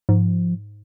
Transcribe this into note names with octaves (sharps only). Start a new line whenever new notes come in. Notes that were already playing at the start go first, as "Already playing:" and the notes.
G#2 F3